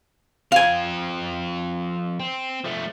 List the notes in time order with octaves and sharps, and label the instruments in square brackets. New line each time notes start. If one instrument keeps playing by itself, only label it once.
[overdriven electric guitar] F3 C4 [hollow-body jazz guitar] F5 G#5
[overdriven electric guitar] C4
F3 A3